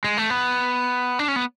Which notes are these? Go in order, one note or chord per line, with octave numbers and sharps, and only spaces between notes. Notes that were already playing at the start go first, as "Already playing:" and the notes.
G#3
A3
B3
D4
C#4
B3